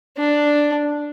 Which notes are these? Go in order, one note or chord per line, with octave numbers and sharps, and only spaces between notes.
D4